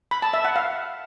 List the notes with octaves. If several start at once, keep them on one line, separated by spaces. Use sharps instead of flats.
B5
A5
E5
F#5
F5